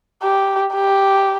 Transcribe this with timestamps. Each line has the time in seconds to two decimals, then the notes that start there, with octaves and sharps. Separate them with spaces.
0.23 G4
0.75 G4